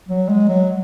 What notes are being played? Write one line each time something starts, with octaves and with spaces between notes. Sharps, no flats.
F#3
G#3
F#3